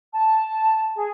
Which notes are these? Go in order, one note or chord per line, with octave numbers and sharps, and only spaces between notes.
A5
G#4